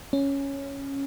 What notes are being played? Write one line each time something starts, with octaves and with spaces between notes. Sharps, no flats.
C#4